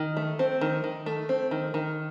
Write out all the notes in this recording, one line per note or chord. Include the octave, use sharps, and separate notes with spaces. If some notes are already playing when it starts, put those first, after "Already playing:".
Already playing: D#3
A3
C4
D#3
D#3
A3
C4
D#3
D#3